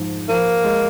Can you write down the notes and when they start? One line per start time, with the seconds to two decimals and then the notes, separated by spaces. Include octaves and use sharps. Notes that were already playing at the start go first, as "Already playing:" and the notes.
Already playing: G#2 F3
0.29 F3 A#3
0.65 G#3